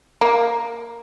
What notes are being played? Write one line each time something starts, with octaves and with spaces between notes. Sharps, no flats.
A#3